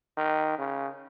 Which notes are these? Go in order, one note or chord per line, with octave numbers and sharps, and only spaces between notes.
D#3
C#3